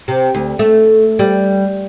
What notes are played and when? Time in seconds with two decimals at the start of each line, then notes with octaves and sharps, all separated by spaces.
0.08 C3
0.35 D2
0.59 A3
1.19 G3